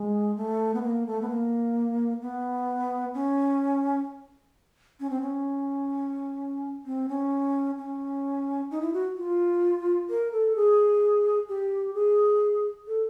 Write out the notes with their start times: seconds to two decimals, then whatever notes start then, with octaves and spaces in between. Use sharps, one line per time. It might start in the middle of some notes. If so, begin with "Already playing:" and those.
Already playing: G#3
0.36 A3
0.74 B3
0.83 A#3
1.07 A3
1.22 B3
1.30 A#3
2.22 B3
3.14 C#4
5.00 C#4
5.10 C4
5.22 C#4
6.86 C4
7.09 C#4
7.78 C#4
8.71 D#4
8.82 E4
8.93 F#4
9.17 F4
10.10 A#4
10.32 A4
10.56 G#4
11.49 G4
11.94 G#4
12.88 A4